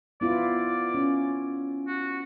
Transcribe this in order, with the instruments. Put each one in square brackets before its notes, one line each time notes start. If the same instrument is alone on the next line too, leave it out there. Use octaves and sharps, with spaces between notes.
[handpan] B3 E4 F4 [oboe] D5
[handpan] C#4
[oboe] F#4